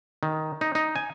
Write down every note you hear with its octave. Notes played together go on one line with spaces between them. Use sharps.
D#3
D#4
D#4
G#5